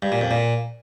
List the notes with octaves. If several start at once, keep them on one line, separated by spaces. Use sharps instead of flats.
G2
A#2
F2
A#2